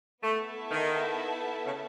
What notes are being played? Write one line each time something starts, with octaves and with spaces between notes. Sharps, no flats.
A3 B3 E4 A4 E5 A5
D#3
C#3